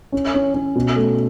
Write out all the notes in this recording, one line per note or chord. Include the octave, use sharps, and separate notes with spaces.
C#4
C#4
C#4
B2
A3